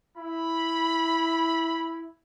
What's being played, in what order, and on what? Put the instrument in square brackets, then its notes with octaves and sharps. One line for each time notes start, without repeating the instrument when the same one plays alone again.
[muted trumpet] E4 [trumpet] B5